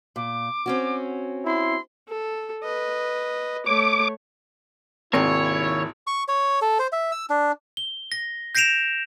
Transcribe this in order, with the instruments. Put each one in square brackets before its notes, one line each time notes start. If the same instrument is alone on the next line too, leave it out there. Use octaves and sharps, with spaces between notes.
[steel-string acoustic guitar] A#2 [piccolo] D6
[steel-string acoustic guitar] C4 C#4 F#4
[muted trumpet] E4 [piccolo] C6
[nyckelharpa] A4
B4 D#5
[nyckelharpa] A3 C#5 [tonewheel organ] D6
[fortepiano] G#1 [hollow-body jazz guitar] D#2 C3 A#3 [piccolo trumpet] E4 [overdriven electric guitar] C#5
[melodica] C#6
C#5
A4
C5
E5
E6
D4
[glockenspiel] G7
A#6
G6 A#6 C7 D7 E7 F7